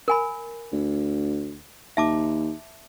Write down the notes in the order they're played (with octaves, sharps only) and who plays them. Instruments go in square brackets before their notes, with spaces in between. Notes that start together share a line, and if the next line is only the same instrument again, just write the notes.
[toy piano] A#4 G#5 B5
[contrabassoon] D2
[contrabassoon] D#2 [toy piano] E5 A5 D6